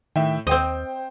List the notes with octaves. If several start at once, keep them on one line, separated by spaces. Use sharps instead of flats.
A2 D#3 E5 G5
D#2 C4 C5 D#5 G5